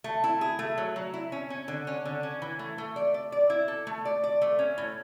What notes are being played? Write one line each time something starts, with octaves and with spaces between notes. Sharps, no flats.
A3
E4
G#4
A3
F#3
F#3
E4
C#4
C#4
D3
C#4
D3
C#4
E3
A3
A3
D5
D5
D5
E4
A4
A3
D5
D5
A3
C#4
A2